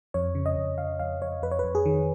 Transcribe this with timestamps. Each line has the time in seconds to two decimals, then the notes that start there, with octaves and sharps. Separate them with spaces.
0.14 F2 C#5
0.35 C#3
0.46 D#5
0.56 F2
0.78 C#3 F5
0.99 F2 F5
1.22 F2 C#5
1.43 F2 B4
1.51 C#5
1.59 F2 B4
1.75 G#4
1.86 D#3